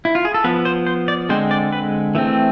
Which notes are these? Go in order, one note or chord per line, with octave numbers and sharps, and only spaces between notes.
E4
F4
G#4
A4
F3 B3 B4
C5
C5
D5
D3 G#3 C4 C5
D5
B4
E3 A3 C4